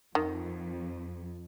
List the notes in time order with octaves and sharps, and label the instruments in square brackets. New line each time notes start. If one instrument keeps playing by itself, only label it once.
[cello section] F2 [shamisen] D#3